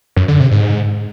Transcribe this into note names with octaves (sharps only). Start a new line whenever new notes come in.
F#2
D3
C3
G#2